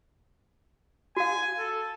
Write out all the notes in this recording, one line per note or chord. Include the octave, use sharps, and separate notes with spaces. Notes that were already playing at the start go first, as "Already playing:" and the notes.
F#4 F5 G#5
A4